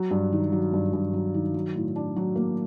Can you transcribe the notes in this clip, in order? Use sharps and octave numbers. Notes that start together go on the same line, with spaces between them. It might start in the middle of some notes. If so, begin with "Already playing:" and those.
Already playing: F#3
G2
D#3
F#3
G2
G2
F#3
D#3
F#3
A2
D4
F#3
A#3